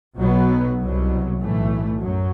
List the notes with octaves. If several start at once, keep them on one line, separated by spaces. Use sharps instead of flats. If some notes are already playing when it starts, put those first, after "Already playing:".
B1 B2 F#3 B3
C2 B2 F#3
B1 A2 E3 A3
F#2 F#3